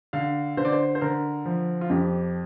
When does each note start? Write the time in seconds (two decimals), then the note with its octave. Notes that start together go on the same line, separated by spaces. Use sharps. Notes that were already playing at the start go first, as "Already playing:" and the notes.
0.13 D3 F5
0.57 D3 C5
0.65 D5
0.72 C5
0.95 C5
1.01 D3 A#4
1.45 F3
1.81 F4
1.90 F2 G4